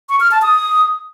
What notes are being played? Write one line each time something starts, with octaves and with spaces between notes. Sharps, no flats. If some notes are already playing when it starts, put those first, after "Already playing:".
C#6
F6
A5
D#6